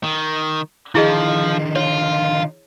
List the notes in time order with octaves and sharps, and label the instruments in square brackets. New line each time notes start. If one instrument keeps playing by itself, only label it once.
[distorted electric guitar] D#3
[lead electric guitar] D3 D#3 [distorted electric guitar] F3 [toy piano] E4 G#4 D#5
[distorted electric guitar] F4 [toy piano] C#5